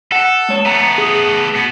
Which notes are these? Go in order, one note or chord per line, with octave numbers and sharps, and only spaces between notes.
A4 F#5
G#3 C#5
A3 B3 A#5
G#4
B2 B3